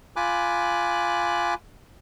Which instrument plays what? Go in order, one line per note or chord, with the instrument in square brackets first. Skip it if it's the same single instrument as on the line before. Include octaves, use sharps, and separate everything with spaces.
[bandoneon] F4 G#5 B5 D6 F#6